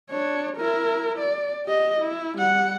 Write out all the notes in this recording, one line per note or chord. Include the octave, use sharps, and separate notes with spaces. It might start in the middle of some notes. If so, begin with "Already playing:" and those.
D4 C#5
E4 A#4
D5
G4 D#5
E4
G3 F#5